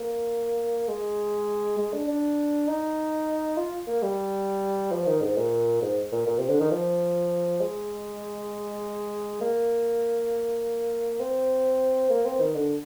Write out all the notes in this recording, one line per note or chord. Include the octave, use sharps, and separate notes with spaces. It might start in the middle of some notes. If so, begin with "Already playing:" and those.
Already playing: A#3
G#3
G#3
D4
D4
D#4
F4
A#3
G3
F3
D#3
G#2
A#2
G#2
A#2
A#2
C3
D3
D#3
F3
G#3
A#3
C4
A#3
C4
D#3
D3